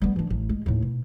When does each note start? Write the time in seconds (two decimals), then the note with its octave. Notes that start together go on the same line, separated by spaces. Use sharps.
0.02 G3 B3
0.16 E3 D4
0.30 A1
0.49 G#3
0.66 D#2 A2
0.82 B2